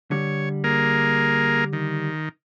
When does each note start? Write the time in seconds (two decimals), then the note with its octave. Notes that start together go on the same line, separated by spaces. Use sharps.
0.11 D3 G3 C#5
0.64 A#3 G#4 A#4
1.73 D#3